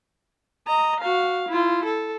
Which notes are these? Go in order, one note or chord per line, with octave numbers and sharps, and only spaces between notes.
D#5 A#5
F#4 F5
E4 F4
A4